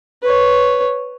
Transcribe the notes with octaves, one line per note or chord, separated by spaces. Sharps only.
B4 C#5